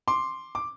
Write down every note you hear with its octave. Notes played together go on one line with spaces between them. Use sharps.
C6 D6
D6